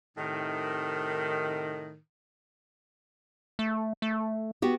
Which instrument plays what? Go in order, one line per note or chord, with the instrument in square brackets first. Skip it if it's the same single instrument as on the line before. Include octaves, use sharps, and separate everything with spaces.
[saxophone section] A2 C3 D#3
[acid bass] A3
A3
[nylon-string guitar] B3 F#4 G4